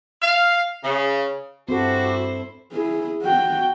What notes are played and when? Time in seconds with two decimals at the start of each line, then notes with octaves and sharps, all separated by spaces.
0.22 F5
0.84 C#3
1.69 G2 C4 E4 F#4 G4 A4 C5 D6
2.72 E4 G#4
3.22 F#4 G5